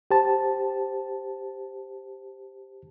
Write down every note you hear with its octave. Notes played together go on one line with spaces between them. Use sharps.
G4 C5 A5